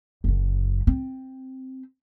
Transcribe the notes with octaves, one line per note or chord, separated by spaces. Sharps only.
F#1 F#2
C4